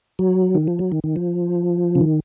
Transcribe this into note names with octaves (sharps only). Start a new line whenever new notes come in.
F#3
D#3
F3
F#3
D#3
D#3
F3
C#3
D#3